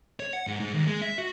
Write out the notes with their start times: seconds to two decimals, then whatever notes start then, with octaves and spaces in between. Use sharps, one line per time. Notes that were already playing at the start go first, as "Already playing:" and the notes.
0.20 C#5
0.33 F#5
0.47 G#2
0.60 G#2
0.73 D#2
0.87 G#3
1.02 E5
1.18 F#4